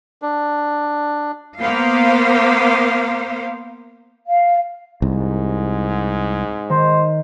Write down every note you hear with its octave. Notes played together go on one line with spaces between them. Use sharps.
D4
A#3 B3 C5 F5
F5
C2 G#2
D#3 C5